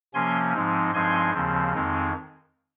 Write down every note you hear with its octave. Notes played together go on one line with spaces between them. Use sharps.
C3 F3 A#3 C#4 G#5 C6
G#2 F3 G#3 C4 D#4
G2 F3 G#3 C4 D#4 G#5 C6
D#2 C#3 F3 C4
F2 D#3 G#3 C4 D#4